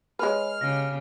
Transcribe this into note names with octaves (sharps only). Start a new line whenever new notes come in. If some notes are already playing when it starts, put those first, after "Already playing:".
G#3 B4 C#5 G#5 B5 F6
C#3 G4 A#6